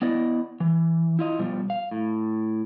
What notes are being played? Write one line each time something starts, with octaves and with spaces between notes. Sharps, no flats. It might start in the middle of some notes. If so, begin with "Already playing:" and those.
B3 E4 D5 D#5
E3
E4 F4 D#5
B2 F3 G3
F5
A2